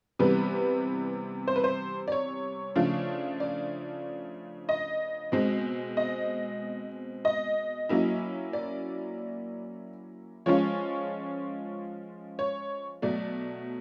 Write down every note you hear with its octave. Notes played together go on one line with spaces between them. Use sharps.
C3 E3 G3 B3 B4
C5
B4
C5
D5
C#5
C#3 F3 A3 D4 F4
D5
D#5
B2 G#3 C4
D#5
D#5
F#3 A#3 C#4 E4
D5
F3 G#3 C#4 F4 C#5
C#5
B2 F#3 A3 D5